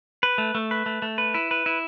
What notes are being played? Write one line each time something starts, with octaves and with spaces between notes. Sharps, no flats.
B4
A3
A3
B4
A3
A3
B4
E4
B4
E4